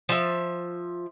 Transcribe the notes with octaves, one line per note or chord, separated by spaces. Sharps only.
F3 E5